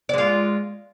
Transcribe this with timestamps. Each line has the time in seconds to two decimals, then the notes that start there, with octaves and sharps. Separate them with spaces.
0.09 D5
0.14 G#3
0.18 F4